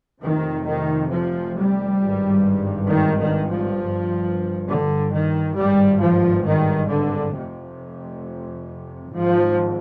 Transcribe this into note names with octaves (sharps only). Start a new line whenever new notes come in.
F1 F2 C3 D#3
D#3
F3
G3
G#1 G2
D#3
D#3
F3
G1 G2
D3
D#3
G#1 G2 G3
F3
D#3
D3
F1 F2 C3
G#1 G#2 F3